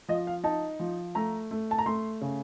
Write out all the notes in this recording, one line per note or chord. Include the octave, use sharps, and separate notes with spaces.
F3 D#5
F5
D#4 A5
F3
A3 A#5
A3
A5
A#5
A3 C6
C#3